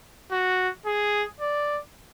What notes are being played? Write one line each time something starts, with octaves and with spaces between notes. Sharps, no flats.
F#4
G#4
D5